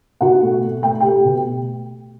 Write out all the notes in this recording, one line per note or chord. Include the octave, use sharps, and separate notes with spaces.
B2 F#4 F#5
A3
A3
A3 G5
A3 G4 G5
B2